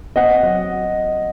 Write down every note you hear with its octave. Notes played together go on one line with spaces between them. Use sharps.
C4 D#5 F#5
F#3